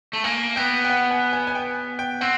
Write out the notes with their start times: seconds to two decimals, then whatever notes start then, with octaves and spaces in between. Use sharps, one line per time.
0.13 A3
0.24 A#3 G#5
0.56 B3 G5
0.84 G5
0.90 F#5
1.11 G#5
1.33 G#5
1.47 G#5
1.55 G5
1.99 G5
2.21 C4 F#5